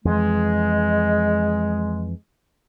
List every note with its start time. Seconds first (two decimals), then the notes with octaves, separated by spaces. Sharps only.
0.05 F2 E3 G#3